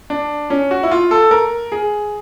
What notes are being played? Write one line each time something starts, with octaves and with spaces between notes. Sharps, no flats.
D4
C#4
F#4
E4
F4
A4
A#4
G#4